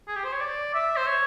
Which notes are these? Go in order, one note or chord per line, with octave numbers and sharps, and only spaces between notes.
G#4
G4
C5
C#5
D5
E5
C5
C#5